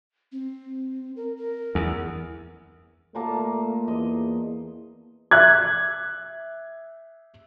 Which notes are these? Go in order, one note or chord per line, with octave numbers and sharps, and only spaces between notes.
C4
A#4
A#4
E2
A#2 A3 A#3 A5
E2 D#5
E5 F#6 G#6